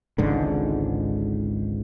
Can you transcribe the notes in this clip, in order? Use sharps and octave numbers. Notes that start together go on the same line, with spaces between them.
G#1 C#2 G#2 D3